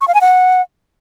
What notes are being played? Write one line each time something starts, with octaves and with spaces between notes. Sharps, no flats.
C#6
F5
G#5
F#5